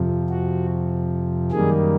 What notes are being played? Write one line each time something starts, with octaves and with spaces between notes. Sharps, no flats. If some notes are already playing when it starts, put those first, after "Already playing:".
Already playing: F2 C3 F3
F#4
F#2 D#3 G3 A#3 G#4